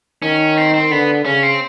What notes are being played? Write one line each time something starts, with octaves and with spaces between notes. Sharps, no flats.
D#3 C#4
C4
C4
D3 B3
C#3 C#4
C4